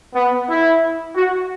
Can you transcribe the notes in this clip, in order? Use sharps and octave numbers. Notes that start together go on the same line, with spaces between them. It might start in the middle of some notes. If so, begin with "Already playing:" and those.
B3
E4
F#4